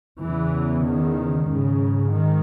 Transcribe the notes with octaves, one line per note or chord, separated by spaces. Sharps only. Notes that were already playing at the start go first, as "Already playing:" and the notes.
E2 C#3 E3
D#3
G#2 C#3
D#3